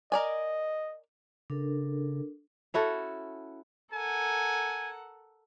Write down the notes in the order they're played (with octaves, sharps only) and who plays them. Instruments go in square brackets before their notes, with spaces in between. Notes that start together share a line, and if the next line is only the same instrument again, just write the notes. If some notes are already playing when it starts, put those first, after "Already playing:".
[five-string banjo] A#4 D5 G#5 [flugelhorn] D#5
[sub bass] C#3 [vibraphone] D4 A4 A#4
[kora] C#4 E4 F#4 A4
[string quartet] A4 A#4 F#5 [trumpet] G#5